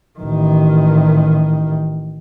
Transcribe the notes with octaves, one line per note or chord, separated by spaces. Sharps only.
A1 D#3